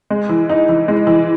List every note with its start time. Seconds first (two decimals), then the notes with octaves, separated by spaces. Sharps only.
0.10 G#3
0.29 E3
0.49 D#4
0.69 E3
0.88 G#3
1.07 E3